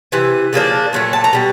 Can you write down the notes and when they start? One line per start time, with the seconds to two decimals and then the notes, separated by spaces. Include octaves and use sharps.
0.12 C3 E3
0.53 C#3 F3 A#3 D4
0.93 A#2 F#3 A3
1.13 A5
1.24 A#5
1.33 B2 G3